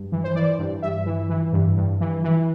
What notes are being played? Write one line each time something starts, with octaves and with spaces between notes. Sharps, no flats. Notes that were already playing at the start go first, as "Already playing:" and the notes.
Already playing: G2
E3
C5
E3 D5
G2
G2 E5
E3
E3
G2
G2
E3
E3